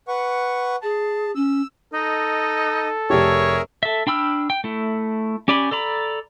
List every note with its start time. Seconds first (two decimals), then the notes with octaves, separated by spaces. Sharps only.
0.08 B4 F#5 C#6
0.82 G#4 A5
1.35 C#4 E6
1.93 D#4 A4 D#5
3.10 F1 G4 G#4 A#4 C#5 E5
3.83 A4 E5
4.07 D4 G5 B5 E6 F6
4.50 G5
4.64 A3 E4
5.48 C#4 G4 D5 G#5 B5
5.71 A4 D5 A#5 B5